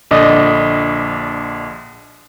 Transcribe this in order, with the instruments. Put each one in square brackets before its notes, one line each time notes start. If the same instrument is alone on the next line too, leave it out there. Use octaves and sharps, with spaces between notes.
[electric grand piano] A#1 D3 D5 D#5